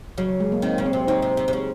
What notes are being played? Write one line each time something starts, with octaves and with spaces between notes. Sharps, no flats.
C#3 F#3
F#3
G#3
A#3
D#3 C4
C#3
C4
C3
C#3 D#4
C3
C3
C3
C#3